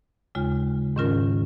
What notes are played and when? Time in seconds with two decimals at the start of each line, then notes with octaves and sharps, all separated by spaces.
0.35 D#2 C#3 G#3 F4
0.96 G#2 D#3 C#4 F4 A#4